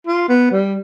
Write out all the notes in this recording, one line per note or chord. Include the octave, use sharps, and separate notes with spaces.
F4
B3
G3